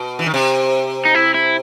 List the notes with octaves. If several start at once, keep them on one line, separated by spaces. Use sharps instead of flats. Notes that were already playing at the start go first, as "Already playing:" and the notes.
Already playing: B2
E3
D#3
C3
D#4
E4
E4